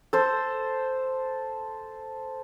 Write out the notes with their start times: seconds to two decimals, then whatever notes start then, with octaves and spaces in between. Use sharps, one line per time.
0.13 A4 C5